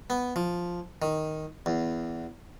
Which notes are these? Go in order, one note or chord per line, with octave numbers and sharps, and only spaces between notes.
B3
F3
D#3
E2